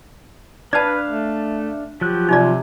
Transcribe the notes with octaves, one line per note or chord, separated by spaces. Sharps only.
D4 B4 D5 F5 A5
A3
F3 F#3 G4 F#6
C3 D#4 F4 D5